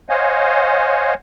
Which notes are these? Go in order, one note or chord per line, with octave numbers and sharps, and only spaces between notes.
C5 C#5 D#5 F5 F#5 G#5